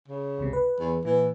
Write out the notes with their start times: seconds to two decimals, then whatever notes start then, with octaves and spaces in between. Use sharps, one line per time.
0.08 C#3
0.38 G1 C#2 C3
0.53 B4
0.80 E2
1.05 A#2 E3